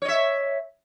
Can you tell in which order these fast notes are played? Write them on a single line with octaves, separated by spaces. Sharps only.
C#5 D#5 E5